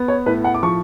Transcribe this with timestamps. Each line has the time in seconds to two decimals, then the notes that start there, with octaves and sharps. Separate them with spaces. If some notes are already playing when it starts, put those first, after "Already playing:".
Already playing: B3
0.08 C#5
0.26 A2 B4
0.44 F#5
0.54 D6
0.63 F3 C#6